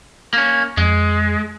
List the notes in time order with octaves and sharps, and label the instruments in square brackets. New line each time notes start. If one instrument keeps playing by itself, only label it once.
[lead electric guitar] A#3 C#4
[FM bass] F2 [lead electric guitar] G#3